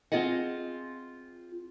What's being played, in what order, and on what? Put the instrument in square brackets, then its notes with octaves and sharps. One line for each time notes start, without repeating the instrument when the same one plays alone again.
[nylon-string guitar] C4 E4 F4 G#4 D#5 F#5